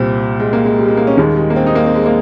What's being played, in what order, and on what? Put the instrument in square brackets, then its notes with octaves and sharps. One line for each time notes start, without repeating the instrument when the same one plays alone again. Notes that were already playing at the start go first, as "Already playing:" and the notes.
Already playing: [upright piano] C2 A#2 G3 C4
G#3
A#3
G#3
G3
G#3
A#3
C#4
D#2 D#3 G3 G#3
G#3
A#3
C4
D#4
A#3
C4
G#3
A#3